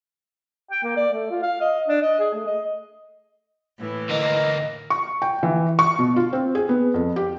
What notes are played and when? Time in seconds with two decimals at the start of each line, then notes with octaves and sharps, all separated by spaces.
0.71 G5
0.83 A#3
0.97 D5
1.13 A3
1.30 F4
1.43 F5
1.61 D#5
1.88 D4
2.02 D#5
2.20 G#4
2.34 A3
2.47 D#5
3.79 A2 E3
4.10 D2 A#3 D#5
4.90 C#6
5.22 G5
5.43 E3
5.79 C#6
5.99 B2
6.16 F4
6.33 C4
6.55 G#4
6.69 B3
6.94 F2
7.16 G4